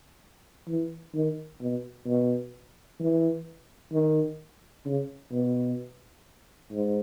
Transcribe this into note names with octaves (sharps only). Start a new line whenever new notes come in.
E3
D#3
B2
B2
E3
D#3
C#3
B2
G#2